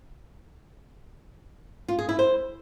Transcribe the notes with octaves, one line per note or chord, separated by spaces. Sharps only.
F4
G#4
E4
C5